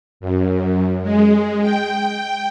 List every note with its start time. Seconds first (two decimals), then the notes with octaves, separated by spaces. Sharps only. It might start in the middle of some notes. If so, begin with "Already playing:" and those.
0.20 F#2
1.02 G#3
1.62 G5